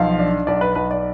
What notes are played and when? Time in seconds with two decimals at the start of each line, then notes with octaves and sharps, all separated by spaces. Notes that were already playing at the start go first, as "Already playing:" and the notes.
Already playing: B1 F3 F5
0.19 D4
0.47 B1 D5
0.61 B4
0.75 B1 B4
0.91 D5